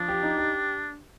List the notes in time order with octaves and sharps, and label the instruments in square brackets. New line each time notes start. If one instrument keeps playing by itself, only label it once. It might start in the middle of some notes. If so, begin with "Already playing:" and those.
Already playing: [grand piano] F3 [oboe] D4
[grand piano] G4
D#4
G4